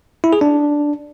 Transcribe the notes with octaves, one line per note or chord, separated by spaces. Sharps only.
E4
G#4
D4